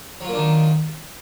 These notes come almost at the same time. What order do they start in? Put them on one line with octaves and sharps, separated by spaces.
F#3 F4 A#3 D4 D#3